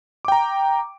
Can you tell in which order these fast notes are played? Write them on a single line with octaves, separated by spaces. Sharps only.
D6 G5 A#5